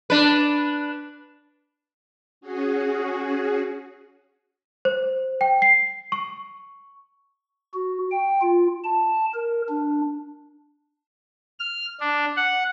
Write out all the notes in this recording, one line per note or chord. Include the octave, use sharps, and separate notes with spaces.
D4 B4
C#4 F#4 G#4
C5
G5
C7
C#6
F#4
G5
F4
A5
A#4
D4
F6
D4
F#5